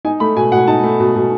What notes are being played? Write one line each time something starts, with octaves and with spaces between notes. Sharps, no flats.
D#4 G#5
A3 B5
B2 G#5
B2 F#5
D#4 A5
A3
B2
B2